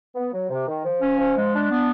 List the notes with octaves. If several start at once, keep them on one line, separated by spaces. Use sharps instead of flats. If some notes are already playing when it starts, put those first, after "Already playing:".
B3
F#3
C3
D#3
F3
C#4
F3
G#3
D4
B3